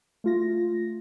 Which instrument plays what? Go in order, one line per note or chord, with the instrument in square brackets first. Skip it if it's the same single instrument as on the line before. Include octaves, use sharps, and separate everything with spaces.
[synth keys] A3 F4 A#6